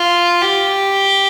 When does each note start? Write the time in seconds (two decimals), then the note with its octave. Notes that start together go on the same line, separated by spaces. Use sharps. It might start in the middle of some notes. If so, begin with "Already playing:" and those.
Already playing: F4
0.42 G4